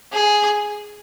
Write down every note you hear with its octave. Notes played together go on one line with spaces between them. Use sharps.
G#4